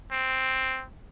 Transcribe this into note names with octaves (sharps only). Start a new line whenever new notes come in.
C4